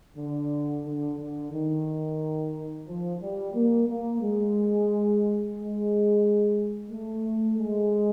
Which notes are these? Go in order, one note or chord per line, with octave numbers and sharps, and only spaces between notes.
D3
D3
D3
D#3
F3
G3
A#3
A#3
G#3
G#3
A3
G#3